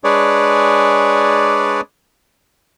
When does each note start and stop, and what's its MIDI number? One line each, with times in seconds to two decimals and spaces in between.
0.04 1.81 56
0.04 1.81 62
0.04 1.81 68
0.04 1.81 71
0.04 1.81 73
0.04 1.81 74